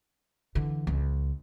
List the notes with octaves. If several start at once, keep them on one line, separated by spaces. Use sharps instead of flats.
D3 E3
C#2